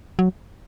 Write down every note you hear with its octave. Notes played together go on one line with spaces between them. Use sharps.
F#3